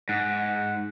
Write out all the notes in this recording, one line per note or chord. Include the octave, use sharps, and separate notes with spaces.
G#2 F#5